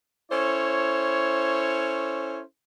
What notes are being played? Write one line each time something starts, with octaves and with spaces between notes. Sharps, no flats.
C#4 E4 A4 C5 C#5